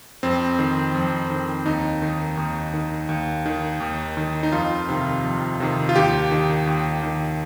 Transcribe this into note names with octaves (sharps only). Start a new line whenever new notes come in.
F2 C4
D#3
F2
D#3
D#2 D#4
D#3
D#2
D#3
D#2
D#3
D#2
D#3
D#4
F2 F4
C3 D#3
F2
C3 D#3
F4
D#2 G4
D#3
D#2
D#3